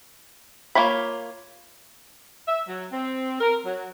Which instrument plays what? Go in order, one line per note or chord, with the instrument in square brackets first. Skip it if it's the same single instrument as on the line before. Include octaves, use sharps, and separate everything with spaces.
[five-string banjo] A#3 F4 C#5 B5
[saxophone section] E5
F#3
C4
A#4
F#3